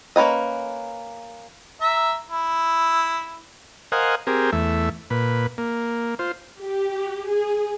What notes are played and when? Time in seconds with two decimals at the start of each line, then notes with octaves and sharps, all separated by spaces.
0.16 A#3 C#4 B4 D#5
1.81 E5 A#5
2.30 E4
3.92 A#4 C5 D#5 F5 F#5 G#5
4.27 C4 G4 G#4 A#4
4.53 E2 A3 E5
5.10 A#2 B4
5.58 A#3
6.19 F4 C5
6.61 G4
7.30 G#4